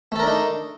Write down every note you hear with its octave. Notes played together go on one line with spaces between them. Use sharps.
A3 D4 D#4 A4 A#4